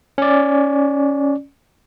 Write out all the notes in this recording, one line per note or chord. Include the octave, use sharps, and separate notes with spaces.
C#4 D5